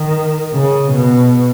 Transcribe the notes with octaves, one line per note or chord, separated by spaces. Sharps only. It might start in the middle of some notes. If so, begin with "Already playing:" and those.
Already playing: D#3
C#3
B2